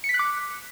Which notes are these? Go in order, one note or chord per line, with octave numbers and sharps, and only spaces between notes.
C#7
B6
F#6
D6